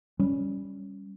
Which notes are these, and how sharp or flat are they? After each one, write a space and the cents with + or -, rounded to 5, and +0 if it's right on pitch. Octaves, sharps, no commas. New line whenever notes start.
G3 +0 C#4 +0